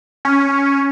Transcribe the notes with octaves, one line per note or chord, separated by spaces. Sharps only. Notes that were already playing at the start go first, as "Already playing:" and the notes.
C#4